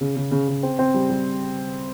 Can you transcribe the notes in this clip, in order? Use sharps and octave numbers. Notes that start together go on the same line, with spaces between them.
C#3
C#3
C#3
C#3
C4
C4
G3
G3